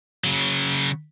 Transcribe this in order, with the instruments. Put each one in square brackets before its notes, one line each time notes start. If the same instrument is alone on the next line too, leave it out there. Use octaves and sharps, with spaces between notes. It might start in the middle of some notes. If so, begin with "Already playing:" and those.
[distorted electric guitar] C#3 F#3